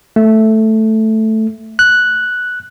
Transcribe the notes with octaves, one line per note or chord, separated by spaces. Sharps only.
A3
F#6